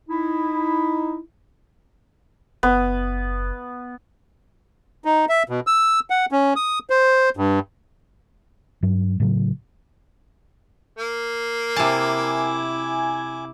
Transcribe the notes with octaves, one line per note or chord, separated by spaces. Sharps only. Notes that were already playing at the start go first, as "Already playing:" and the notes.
D#4 E4
F#1 B3
D#4
E5
B2
E6
F#5
C#4
D#6
C5
G2
G2 F#3
A2 C#3 F#3
A#3
C3 E4 G#5 A5 D6